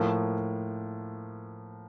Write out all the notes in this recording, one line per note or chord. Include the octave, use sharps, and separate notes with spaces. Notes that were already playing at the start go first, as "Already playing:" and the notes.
Already playing: A2 F3 A#3